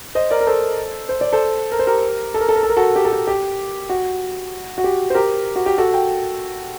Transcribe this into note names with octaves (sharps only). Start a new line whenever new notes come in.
C5 D#5
A#4 D5
A#4
A4 C5
C5
D5
A4 C5
A#4
C5
G4 A#4
A4
A#4
A4
A#4
A4
A#4
F#4 A4
G4
A4
G4
G4
F#4
F#4
G4
C5
G4 A#4
F#4
G4
F#4 A4
G5